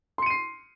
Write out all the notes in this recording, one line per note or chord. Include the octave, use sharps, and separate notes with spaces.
C6 C7 C#7 D#7